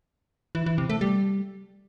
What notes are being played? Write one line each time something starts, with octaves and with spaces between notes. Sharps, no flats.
E3
E3
C3
A3
G3